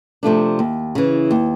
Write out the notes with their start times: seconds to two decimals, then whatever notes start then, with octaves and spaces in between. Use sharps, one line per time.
0.23 C3 F3 A3 D4
0.59 D#2
0.95 C#3 E3
1.31 D#2